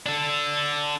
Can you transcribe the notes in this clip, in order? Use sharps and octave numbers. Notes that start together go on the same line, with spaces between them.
D4 A4